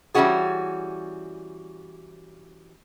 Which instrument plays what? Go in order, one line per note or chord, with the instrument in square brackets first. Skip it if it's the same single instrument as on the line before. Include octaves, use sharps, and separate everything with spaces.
[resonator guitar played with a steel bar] E3 G3 C4 C#4 F#4 G#4